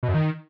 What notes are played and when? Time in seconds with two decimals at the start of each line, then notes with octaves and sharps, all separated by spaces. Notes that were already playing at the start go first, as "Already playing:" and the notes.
0.03 B2
0.09 F#2
0.14 D#3